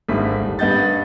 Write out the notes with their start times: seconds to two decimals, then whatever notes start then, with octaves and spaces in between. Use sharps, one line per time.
0.09 G#1 G2 A3 B6
0.41 D#1
0.59 G2 B4 D#5 F#5 G6 A6